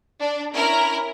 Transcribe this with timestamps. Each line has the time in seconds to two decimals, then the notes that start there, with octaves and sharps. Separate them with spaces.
0.20 D4
0.54 C#4 E4 A#4